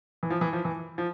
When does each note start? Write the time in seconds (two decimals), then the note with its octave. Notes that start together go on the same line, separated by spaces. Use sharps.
0.23 E3
0.30 F3
0.41 E3
0.53 F3
0.65 E3
0.98 F3